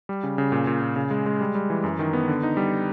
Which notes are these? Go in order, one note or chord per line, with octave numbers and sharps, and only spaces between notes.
G3
C#3
C#3
A#2
A#2
A#2
C#3
G#3
G#3
G3
G3
E3
F#2
D#3
B3
D3
D#4
G3